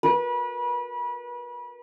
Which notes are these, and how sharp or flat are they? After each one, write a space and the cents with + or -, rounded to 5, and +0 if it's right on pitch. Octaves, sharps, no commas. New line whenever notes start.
B4 -30